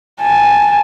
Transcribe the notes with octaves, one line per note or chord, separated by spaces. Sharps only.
G#5 A5